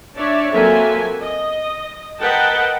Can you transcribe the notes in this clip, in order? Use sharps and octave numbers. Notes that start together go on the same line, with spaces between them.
D4 C#5 D5 E5
F#3 A#3 C4 A4 E5 G#5
D#5
A#4 B4 D#5 F#5 G5 A5